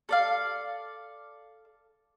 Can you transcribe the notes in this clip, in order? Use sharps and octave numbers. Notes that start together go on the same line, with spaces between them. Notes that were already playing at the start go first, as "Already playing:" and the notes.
A4 D5 F5